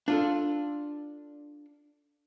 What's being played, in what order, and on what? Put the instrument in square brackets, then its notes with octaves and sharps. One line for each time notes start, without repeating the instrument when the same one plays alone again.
[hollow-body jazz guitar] D4 F4 A4